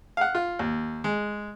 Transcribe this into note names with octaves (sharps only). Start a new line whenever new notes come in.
F5 F#5
F4
D#2
G#3